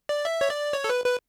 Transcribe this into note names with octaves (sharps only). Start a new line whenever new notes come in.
D5
E5
C#5
D5
C#5
A4
B4
B4